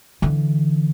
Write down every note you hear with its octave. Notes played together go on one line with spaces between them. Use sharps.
D3 E3